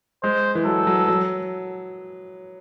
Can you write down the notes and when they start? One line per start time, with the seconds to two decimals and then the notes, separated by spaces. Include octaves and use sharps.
0.23 G#3 C5
0.55 E3
0.65 F#3 A4
0.87 F#3
1.08 F#3